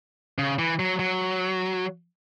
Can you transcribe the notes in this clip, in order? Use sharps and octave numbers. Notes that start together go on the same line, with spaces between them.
C#3
E3
F#3
F#3